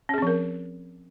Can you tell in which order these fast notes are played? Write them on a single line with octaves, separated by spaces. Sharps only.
C#4 G#4 C4 F3 A#4